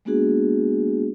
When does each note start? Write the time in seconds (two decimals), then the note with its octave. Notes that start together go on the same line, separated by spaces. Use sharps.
0.05 G#3 A#3 B3 D4 F#4 G#4